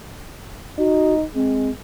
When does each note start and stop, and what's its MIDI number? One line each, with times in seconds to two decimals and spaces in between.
0.79 1.26 63
0.79 1.14 66
1.35 1.70 56
1.35 1.70 60